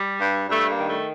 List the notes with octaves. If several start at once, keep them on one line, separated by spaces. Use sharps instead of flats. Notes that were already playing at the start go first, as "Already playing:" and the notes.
Already playing: G3
G2
G2 A3
A#3
D#3
A3